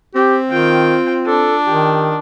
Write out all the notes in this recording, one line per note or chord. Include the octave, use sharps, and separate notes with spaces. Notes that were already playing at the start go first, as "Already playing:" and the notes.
C4 G4
D#3 F4 G5
D4 A4
D#3 G4